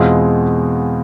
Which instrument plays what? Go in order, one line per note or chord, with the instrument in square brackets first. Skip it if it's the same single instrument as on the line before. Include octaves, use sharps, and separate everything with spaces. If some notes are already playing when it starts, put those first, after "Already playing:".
Already playing: [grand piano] E2 B2 G#3 C4 F4